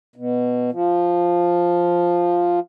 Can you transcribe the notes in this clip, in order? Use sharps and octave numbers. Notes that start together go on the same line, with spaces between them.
B2
F3